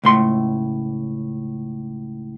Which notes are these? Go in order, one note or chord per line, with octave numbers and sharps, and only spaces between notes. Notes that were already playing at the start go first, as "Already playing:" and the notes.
C#2 A2 C6